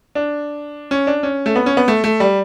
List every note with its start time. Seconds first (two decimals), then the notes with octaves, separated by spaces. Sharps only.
0.15 D4
0.91 C#4
1.07 D4
1.23 C#4
1.46 A3
1.56 B3
1.66 C#4
1.77 B3
1.88 A3
2.04 A3
2.20 G3